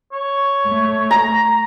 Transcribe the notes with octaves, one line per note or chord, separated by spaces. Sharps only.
C#5
A3
A#5